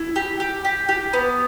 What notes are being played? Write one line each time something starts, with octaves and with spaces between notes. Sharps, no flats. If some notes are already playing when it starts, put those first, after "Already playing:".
Already playing: E4
G4
G4
G4
G4
B3